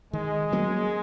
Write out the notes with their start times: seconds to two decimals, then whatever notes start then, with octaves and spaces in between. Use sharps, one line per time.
0.13 D#3 G#3
0.52 F#3 A#3 C#4